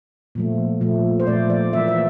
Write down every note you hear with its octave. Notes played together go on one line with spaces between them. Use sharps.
A#2 F3 A3
A#2 F3 A3
C5
A#2 F3 A3 D5
D5
E3 A#3 E5
E5